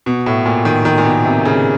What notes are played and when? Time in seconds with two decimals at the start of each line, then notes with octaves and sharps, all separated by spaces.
0.06 B2
0.26 A2
0.46 A#2
0.65 D#3
0.85 D#3
0.98 A#2
1.05 B2
1.25 C3
1.45 C#3